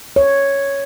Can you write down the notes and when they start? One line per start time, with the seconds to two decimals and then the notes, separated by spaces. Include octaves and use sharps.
0.16 C#5